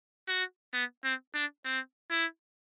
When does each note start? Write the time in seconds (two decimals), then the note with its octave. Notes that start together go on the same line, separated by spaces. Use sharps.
0.28 F#4
0.74 B3
1.04 C4
1.34 D4
1.65 C4
2.11 E4